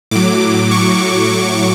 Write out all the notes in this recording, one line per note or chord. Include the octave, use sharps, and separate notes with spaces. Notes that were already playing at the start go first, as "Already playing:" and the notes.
A2 F#3 D6
C#6